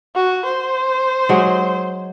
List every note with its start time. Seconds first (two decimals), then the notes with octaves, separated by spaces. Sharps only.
0.15 F#4
0.45 C5
1.29 F#3 G#3